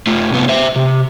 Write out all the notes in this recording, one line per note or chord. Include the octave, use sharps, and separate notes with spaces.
A3 F4
C2 B3
C5 E5
C3